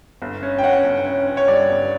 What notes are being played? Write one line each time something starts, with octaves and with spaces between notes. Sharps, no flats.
G1
C#4
G5
C#4 F#5
G1
C#4
C#4
C#5
G2 D5
G1